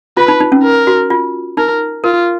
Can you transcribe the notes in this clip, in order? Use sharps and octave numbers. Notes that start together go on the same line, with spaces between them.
F4 B4
D#4
D#4
C#4
A#4
F#4
F4
D#4 A#4
F4 A#4